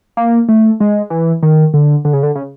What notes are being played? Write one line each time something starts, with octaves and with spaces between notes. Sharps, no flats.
A#3
A3
G#3
E3
D#3
D3
D3
C#3
D3
C#3